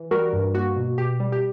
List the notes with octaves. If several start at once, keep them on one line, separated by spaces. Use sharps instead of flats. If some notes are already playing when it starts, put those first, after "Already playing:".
Already playing: E3
G3 F#4 A#4
G2
A#3 F#4
B2
B2 G4
G3
G4